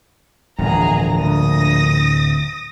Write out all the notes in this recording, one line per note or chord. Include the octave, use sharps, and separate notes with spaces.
D1 A#1 E2 G2 G#4 A#5
D2 D#6 A#6